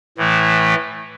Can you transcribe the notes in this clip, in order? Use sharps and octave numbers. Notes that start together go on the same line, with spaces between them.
A2 E3 A3